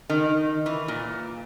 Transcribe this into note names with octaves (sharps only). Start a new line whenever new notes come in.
D#3
E3
A#2